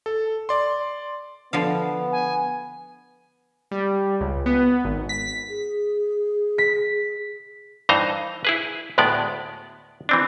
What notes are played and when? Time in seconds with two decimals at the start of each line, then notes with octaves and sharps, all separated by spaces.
0.06 A4
0.49 D5 C6
1.53 D3 F3 B3 F5
2.12 G#5
3.71 G3
4.20 C#2
4.46 B3
4.84 G#1
5.09 B6
5.50 G#4
6.58 B6
7.89 G2 E3 D#4 C5 A#5
8.45 E4 G#4 B4
8.98 D2 A2 G#3 B3 D5
10.09 E3 C4 D4